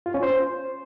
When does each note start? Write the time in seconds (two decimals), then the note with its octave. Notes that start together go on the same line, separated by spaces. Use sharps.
0.06 F4
0.14 C#4
0.23 C5